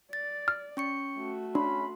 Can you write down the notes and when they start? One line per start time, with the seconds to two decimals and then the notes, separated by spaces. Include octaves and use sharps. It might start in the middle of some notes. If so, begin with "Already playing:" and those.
0.13 D5 A6
0.48 F6
0.77 C#4 C#6 C#7
1.18 A3 F#4
1.55 C#4 D4 B5 C6